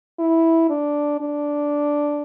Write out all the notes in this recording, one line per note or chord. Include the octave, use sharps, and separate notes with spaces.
E4
D4
D4